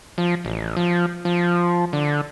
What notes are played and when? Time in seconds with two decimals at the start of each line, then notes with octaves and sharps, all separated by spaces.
0.18 F3
0.45 A1
0.77 F3
1.25 F3
1.93 D3